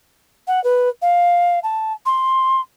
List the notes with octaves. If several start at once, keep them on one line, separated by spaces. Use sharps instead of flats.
F#5
B4
F5
A5
C6